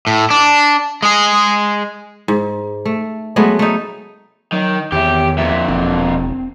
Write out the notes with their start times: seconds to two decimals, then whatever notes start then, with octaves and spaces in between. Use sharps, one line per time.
0.07 A2
0.30 D4
1.03 G#3 G#4
2.28 G#2
2.86 A3
3.36 F#3 G#3 A3 B3
3.59 A3 D#4
4.52 D#3 F#3
4.92 E2 D#3 G4 C#5 E5
5.38 F2 A#2 E5
5.68 E1 C4